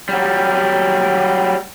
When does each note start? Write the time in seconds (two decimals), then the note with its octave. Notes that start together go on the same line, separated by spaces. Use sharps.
0.09 F#3 G3